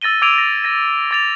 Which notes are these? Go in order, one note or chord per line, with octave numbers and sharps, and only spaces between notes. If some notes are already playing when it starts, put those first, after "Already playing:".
E6 A6 A#6 D#7 G7
D6 E6 G#6 D7 D#7 F7
A#6
A6 A#6 D#7
D6 A6 F7